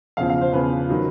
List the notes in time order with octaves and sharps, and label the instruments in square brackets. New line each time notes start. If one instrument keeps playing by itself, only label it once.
[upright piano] E2 C#3 F3 F5
F5
C5
E2 C#3 F3 B4
D#3 F#3